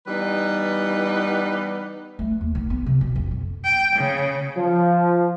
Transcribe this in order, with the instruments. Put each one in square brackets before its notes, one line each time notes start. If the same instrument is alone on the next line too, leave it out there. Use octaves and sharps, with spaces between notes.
[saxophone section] E3 G3 B3 D#4 B4
[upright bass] A3
D#2
D#3
B3
C3
B2
F2
G#3
[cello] G5
C#3
[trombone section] F3